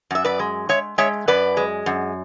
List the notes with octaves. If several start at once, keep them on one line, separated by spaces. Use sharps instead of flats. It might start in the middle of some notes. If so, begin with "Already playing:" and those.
F#2 E5
B4 D5
G#3
G#3 C#5 E5
G#3 C#5 E5
F#2 B4 D5
G#3
F#2